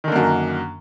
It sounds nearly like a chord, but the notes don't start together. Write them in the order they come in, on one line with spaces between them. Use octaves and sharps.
D#3 D3 A#3 F#2